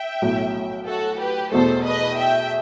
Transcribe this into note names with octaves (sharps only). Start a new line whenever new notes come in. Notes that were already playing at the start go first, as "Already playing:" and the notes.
Already playing: E5 G5
B1 A2 F#3
F#4 A4
G4 B4
E2 B2 A3 A4 C5
B4 D#5
E5 G5